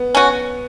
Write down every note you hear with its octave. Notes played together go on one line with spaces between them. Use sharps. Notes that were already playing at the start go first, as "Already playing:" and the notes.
Already playing: B3
C#4 F#4